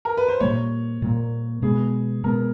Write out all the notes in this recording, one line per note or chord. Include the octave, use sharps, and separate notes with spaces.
A#4
B4
C5
A#2 G3 A#3 C#5
A#2 G3 A#3
B2 G#3 B3 G#4
B2 G#3 B3 A#4